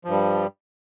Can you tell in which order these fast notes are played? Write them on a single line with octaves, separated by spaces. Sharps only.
F3 G2 G3